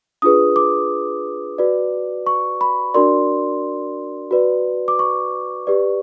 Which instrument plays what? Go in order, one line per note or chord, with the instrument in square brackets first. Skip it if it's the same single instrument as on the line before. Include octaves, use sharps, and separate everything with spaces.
[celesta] D4 F4 G#4 B4 D#6
D6
F#4 B4 D5
C#6
B5
D4 F#4 A#4 D5 C6
F#4 B4 D5
D6
C#6
G4 B4 D5